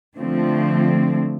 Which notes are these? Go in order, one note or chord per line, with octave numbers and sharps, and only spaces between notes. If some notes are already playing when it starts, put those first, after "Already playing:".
D3 F3 A3 C4